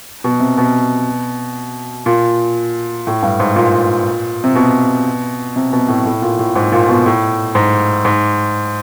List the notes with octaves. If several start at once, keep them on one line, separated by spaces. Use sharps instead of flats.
B2
C3
B2
A#2
A2
G2
G#2
A#2
C3
B2
C3
B2
A2
A2
A#2
A2
G#2
A#2
B2
A2
G#2
G#2